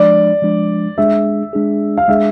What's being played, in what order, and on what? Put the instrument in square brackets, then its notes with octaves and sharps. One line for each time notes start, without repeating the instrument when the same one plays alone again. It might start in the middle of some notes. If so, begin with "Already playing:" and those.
Already playing: [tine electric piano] F3 G#3 D4 [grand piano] D5
[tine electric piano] F3 G#3 D4
[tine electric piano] G#3 D4 G#4 [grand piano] E5
[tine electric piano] G#3 D4 G#4
[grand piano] F5
[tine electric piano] G#3 D4 G#4 [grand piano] E5